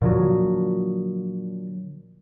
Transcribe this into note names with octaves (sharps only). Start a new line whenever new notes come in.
A#2 D3 F3 F#3